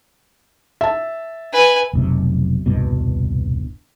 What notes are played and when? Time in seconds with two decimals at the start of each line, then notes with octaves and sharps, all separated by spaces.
0.81 E5 A5
1.53 B4 G#5
1.93 F1 B1 C3
2.66 D#1 C2 G2 B2